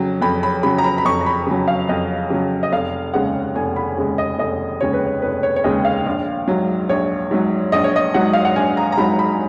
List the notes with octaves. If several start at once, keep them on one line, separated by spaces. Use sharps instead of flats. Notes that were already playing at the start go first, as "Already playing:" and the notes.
Already playing: F2 C#3 F#3
F2 B5
B5
C#3 F#3 B5
A#5
B5
B5
F2 C#6
A#5
B5
C#3 F#3
F5
F2 D#5
C#3 F#3
D#5
F1 F5
D#2 C#3 G#3 F#5
F1 G#5
B5
D#2 C#3 G#3
D#5
F1 D#5
D#2 C#3 G#3 C#5
B4
C#5
F1 B4
C#5
C#5
D#2 C#3 G#3 D#5
F5
A#1
G#2 F#3
A#1 C#5
G#2 F#3
A#1 D#5
C#5
D#5
G#2 F#3 F#5
F5
F#5
A#1 G#5
A#5
A#5
G#2 F#3 B5
B5